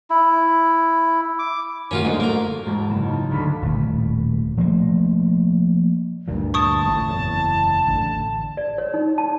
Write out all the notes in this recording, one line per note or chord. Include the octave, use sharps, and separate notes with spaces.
E4
D6
A2 D#3 C#4 F4 F#4
G#2 D3 A#3
A3 A#3 A#5
E1 G#2 F#4 G#4 A5
F#1 C#3 E7
D#4 F4
D2 D3 F5 B5 D#7 E7
D#1 A2
F3 A3 A#3
D2 G2 A#2
A5 C#6 D#6
A1 A2
F#1 E2
A1 D3
D5
C#5
D#4
A5